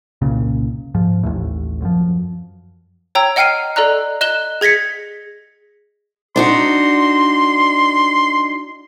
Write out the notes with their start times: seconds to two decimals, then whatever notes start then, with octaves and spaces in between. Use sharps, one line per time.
0.21 F#1 C2 A#2 C#3
0.94 G#2 F3
1.23 A1 D#2 A2
1.82 F#2 F3
3.15 C#5 G5 A#5 E6
3.36 D#5 F#5 G5 F6 C7 D#7
3.76 A4 D5 D#5 A#5 F#6
4.21 D#5 F#6 E7 G7
4.61 G#4 G#6 A#6 B6 C#7
6.36 D4 D#4 F#4 C6